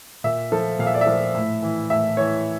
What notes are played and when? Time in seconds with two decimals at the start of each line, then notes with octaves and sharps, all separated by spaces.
0.24 A#2 E5
0.52 F3 A4
0.79 A#2 F5
0.87 E5
0.94 D5
1.01 E5
1.07 F3
1.35 A2
1.62 E3
1.90 A2 E5
2.17 E3 C#5